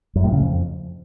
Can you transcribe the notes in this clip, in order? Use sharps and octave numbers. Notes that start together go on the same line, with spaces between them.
F#2
A2
C#3
F2